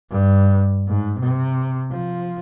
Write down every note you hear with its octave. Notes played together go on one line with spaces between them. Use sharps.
G2
G#2
C3
F3